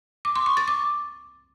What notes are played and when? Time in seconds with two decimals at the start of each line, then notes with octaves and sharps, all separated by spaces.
0.25 D6
0.36 C6
0.46 C#6
0.57 A6
0.68 D6